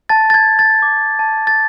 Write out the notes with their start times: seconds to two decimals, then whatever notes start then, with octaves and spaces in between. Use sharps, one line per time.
0.09 A5 A6
0.30 A6
0.34 G#6
0.46 A5
0.59 A6
0.82 D6
1.19 A5
1.47 A6